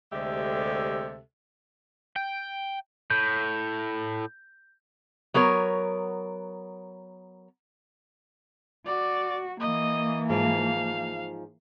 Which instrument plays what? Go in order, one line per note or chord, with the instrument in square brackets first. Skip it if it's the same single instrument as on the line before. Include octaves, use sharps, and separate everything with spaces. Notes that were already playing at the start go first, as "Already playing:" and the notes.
[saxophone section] D2 C3 G#3 G4 A4 E5
[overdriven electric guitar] G5
[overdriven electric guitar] A2 [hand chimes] G6
[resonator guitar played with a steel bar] F#3 B3 A#4 C#5
[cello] F#4 [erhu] D5
[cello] E3 A#3 [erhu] D#5
[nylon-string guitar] G#2 F3 [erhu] F5